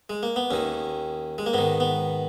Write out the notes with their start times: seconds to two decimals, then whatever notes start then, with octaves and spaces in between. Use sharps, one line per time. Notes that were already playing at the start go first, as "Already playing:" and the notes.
0.10 G#3
0.23 A#3
0.36 B3
0.50 D#2 D#3 C#4
1.38 G#3
1.46 A#3
1.53 G#2 D#3 B3
1.80 B3